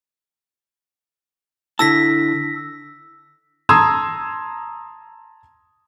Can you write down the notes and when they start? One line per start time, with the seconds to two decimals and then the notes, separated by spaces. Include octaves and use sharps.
1.79 D3 E4 A5 E6 A#6 B6
3.69 A5 A#5 C6 D#6 E6 G#6